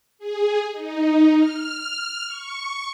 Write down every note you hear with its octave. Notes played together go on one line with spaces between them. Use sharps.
G#4
D#4
F6
C#6